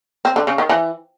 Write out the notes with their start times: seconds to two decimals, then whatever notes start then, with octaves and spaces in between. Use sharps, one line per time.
0.25 C4
0.36 D3
0.47 C#3
0.58 D#3
0.69 E3